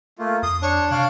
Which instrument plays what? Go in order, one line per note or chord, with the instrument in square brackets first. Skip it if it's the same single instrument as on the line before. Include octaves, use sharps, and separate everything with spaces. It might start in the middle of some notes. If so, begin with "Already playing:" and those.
[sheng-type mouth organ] A3 A#3 F4
[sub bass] F2 [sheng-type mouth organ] C6 [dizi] D#6
[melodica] D4 [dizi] C#5
[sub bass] C3 [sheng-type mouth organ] C#5 D5 F#6 [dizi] F5